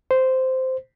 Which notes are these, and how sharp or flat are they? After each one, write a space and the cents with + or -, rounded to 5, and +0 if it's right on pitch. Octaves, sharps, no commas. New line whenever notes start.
C5 -10